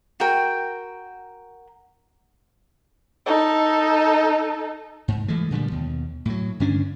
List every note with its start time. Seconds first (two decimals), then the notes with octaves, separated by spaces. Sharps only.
0.20 F#4 A#4 G5
3.26 D#4 A4
5.08 G#2
5.28 E3 F3 G#3 A3
5.51 A#2 D3 F3 G3
5.72 D#2 B2
6.25 A2 F#3
6.60 G2 D3 C#4 D4